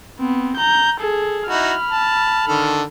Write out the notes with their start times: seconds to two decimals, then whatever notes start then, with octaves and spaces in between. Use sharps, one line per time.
0.19 B3 C4
0.56 A#5 G6
1.00 G#4 A4
1.49 D#4 E4 F#4 B5 F6
1.90 A5
2.47 D3 D#3 A4